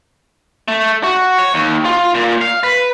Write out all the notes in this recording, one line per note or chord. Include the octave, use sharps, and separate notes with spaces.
A3
F#4
C#5
D#2
F4
A#2
F5
B4